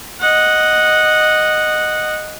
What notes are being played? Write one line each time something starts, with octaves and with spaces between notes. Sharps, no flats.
D#5 F#5